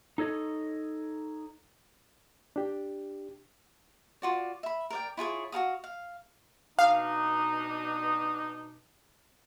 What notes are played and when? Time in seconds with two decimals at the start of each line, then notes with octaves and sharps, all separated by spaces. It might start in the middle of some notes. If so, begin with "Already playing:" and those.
0.18 D#4 A4 C#5 D#5
2.56 D4 G4
4.22 F4 F#4 D5
4.63 E5 B5
4.90 A#4 D5 G5
5.17 E4 F4 G#4 C#5
5.52 F#4 A4 F5 D#6
5.84 F5
6.79 B2 D4 D#4 F5